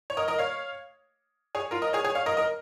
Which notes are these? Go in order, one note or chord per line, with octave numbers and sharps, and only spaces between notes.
C#5
A#4 D#5
A#4 D#5
C#5 F5
G#4 C#5
F4 A#4
A#4 D#5
G#4 C#5
G#4 C#5
C#5 F5
A#4 D#5
A#4 D#5